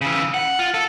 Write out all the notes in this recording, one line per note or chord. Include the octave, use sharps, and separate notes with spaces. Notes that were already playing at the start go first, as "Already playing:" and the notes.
C#3 E3
F#5
F4
A4